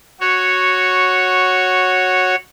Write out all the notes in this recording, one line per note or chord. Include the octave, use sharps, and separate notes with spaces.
F#4 C#5